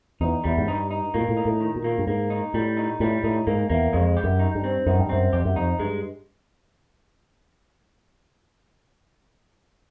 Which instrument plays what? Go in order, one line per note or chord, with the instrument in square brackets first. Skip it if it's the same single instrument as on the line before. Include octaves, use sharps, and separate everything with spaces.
[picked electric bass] E2 [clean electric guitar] D#4
[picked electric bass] E2 [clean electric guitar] G3
[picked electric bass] G#2
[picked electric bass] G2 [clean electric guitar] D#4
[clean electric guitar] D#4
[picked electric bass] A2 [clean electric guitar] A#3
[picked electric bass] A#2
A2
[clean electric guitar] D#4
[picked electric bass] A2
[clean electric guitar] D#3
[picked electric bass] A#2
[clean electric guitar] A#3
[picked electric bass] G2
[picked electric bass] G#2 [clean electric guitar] A#3
[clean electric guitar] D#4
[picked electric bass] A2 [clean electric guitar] G3
[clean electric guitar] D#4
[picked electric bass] A2 [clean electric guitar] G3
[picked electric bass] A2 [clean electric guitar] D#4
[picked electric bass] G#2 [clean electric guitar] A#3
[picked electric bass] E2 [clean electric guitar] A#3
[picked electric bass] F2 [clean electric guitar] G#3
[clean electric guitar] G4
[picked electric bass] F#2
[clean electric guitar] D#4
[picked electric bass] G2
[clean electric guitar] C4
[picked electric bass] F#2 [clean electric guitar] D#4
[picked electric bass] G2
[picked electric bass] F#2 [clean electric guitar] C4
[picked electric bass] F2 [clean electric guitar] G4
[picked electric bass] F#2
[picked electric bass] F2 [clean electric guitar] D#4
[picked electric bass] G2 [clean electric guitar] G#3